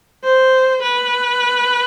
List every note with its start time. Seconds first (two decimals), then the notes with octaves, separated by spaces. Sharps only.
0.24 C5
0.82 B4